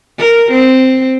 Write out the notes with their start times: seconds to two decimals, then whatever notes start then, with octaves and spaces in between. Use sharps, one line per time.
0.18 A#4
0.52 C4